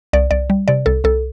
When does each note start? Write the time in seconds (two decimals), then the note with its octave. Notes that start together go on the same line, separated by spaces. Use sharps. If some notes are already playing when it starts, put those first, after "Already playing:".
0.13 C2 D5
0.31 C2 D5
0.50 G3
0.68 C3 D5
0.86 C2 A4
1.04 C2 A4